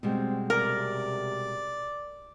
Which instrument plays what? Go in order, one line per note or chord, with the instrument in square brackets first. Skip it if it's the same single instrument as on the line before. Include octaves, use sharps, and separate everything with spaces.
[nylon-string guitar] B2 G3 G#3 [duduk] C4
[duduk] C3 [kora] A#4 [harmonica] D5